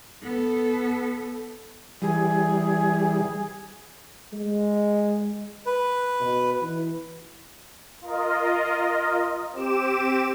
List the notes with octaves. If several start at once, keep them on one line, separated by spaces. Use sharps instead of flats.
B3 A4
E3 G3 G#4
G#3
B4
B2
E3
F4 A#4 D#5
C4 G4 D6 E7